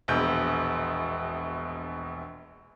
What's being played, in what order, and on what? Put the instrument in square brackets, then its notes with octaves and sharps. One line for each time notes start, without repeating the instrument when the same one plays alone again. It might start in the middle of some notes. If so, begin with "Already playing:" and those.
[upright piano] E1 A#1 B2 G6